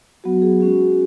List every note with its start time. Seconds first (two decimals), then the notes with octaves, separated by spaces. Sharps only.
0.24 F#3 B3 F#4
0.42 G#4
0.60 G#3 C#4 F#4